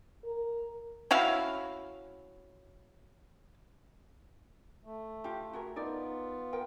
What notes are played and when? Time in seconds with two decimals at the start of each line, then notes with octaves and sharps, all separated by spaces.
0.25 A#4
1.11 C#4 E4 F#4 F5
4.84 A3
5.24 F4 G4
5.53 F#4 G#4 A#4
5.76 B3 D#4 F4 A#4 D5
6.53 A#4 G5